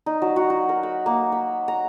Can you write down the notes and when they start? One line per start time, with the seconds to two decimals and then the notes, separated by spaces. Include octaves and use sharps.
0.06 D#4
0.22 F#3
0.36 F#4
0.50 F#4
0.69 A#4
0.83 B5
1.06 A#3
1.32 B5
1.68 A#5